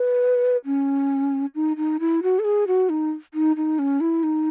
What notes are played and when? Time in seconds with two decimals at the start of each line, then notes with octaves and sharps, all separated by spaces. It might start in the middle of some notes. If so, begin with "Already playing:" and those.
Already playing: B4
0.66 C#4
1.55 D#4
1.77 D#4
2.00 E4
2.23 F#4
2.39 A4
2.44 G#4
2.67 F#4
2.90 D#4
3.34 D#4
3.56 D#4
3.79 C#4
4.01 E4
4.23 D#4